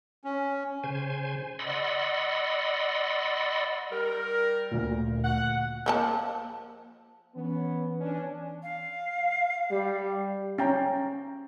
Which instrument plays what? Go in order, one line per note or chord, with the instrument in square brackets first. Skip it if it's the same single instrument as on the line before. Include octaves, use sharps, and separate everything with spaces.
[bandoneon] C#4
[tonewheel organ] C#3 C5 G#5
D5 D#5 F#5 B5 C6 E6
[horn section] G3 A#4
[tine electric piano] D2 A#2
[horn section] F#5
[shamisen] F3 A#3 A5
[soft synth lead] E3 [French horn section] B3 C#4
[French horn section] C#4 D4
[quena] F5
[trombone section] G3
[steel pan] C#4 G5 A#5